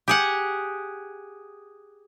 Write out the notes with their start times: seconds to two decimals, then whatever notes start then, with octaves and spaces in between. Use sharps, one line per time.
0.08 G4 G#4 F#5